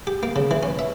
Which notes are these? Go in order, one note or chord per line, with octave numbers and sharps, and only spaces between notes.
G4
A#3
C#3
E3
C#4
E5